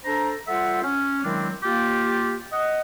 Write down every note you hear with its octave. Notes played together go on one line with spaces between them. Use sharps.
D4 A4 C5 A#5
G3 F4 A4 C5 E5 F#5
C#4
D#3 F#3 G#3 C4 D4 E4
A#3 F4 G4
D#5 F#5 D#6